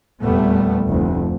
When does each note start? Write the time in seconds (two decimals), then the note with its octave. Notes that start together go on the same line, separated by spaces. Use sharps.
0.23 F1 E2 A#2 G3 A3 B3
0.86 F1 D2